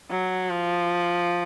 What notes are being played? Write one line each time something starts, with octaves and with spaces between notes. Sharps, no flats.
F#3
F3